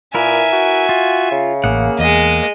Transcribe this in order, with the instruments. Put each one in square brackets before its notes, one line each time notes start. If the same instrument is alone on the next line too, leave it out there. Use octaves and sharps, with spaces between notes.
[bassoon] A#2 [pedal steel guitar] E4 A#4 B4 [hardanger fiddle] E5 G#5
[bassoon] F#4
[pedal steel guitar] F4
[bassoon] C#3
[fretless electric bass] A1 [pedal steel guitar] A#3 G#4 F#5
[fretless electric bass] E2 [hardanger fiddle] G#3 D#5